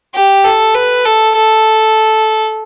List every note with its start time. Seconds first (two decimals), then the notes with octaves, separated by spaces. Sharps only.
0.15 G4
0.45 A4
0.75 B4
1.05 A4
1.36 A4